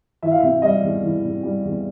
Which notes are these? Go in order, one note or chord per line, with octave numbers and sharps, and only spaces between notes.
E3 E5
F5
C3 E5
G3 D#5
E2
E3
C3
G3
E2